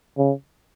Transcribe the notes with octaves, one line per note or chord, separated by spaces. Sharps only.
C#3